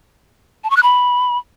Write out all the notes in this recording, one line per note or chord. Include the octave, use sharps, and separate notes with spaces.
A5
C#6
F#6
B5